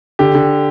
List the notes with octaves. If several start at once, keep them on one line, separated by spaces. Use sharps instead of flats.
D3 G4
D3